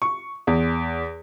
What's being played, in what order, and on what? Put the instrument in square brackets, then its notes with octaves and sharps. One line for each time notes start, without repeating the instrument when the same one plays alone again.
[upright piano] C#6
E2